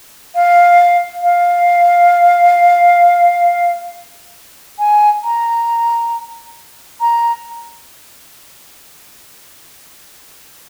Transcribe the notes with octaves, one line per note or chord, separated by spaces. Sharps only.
F5
F5
G#5
A#5
A#5